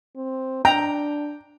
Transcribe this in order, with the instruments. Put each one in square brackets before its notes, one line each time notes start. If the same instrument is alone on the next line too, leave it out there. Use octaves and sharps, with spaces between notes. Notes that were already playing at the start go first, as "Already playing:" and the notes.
[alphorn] C4
[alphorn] D4 [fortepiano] G5 [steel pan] A#5